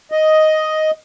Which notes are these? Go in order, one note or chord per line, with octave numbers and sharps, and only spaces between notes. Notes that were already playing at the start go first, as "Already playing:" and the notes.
D#5